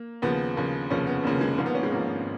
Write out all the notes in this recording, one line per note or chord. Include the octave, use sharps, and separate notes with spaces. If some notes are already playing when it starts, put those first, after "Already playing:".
Already playing: A#3
D#2 C#3 F3 B3
D#2 C#3 F3
F1 D#2 C#3 F3 C#4
B3
F1 D#2 C#3 F3 A#3
G#3
G#1 G#2 F3 A#3
B3
C#4
G#3
G#1 G#2 F3 A#3